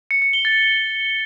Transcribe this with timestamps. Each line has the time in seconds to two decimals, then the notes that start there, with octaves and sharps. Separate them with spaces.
0.11 C#7
0.22 C#7
0.33 G7
0.45 A6